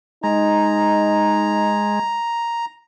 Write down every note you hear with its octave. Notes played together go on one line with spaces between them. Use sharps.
G#3 D#4 A#5